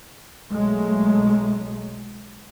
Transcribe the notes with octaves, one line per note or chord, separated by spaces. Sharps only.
B1 F#3 G#3 A3